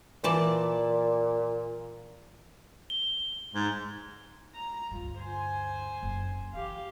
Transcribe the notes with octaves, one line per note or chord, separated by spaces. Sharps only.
A#2 E3 D5 A5
G7
G#2
A#5
D2 G2 F4
C5 G#5
F#1
E3 G4 F5